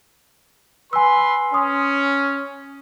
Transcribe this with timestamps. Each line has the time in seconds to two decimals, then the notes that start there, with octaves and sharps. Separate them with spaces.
0.93 B4 G#5 C6 E6
1.54 C#4 C6 D#6